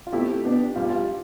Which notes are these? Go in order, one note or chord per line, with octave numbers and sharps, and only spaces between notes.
F4
B2 A3 C4 E4 G4
B2 B3 D4
B1 B2 G3 F4
G4
F4